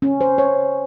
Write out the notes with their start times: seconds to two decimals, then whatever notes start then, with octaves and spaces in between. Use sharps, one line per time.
0.02 C#4
0.21 C5
0.38 C#5